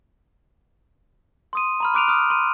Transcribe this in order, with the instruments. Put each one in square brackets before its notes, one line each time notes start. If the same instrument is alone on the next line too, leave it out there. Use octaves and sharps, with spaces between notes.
[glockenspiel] C6 D#6 D#7
A#5 B5 F6
C6 D6 F#6 D7 D#7 F7
D#6 F6 F#6
C6 D#7